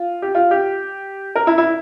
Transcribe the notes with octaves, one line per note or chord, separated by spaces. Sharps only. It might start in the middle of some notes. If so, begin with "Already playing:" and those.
Already playing: F4
G4
F4
G4
A#4
E4
E4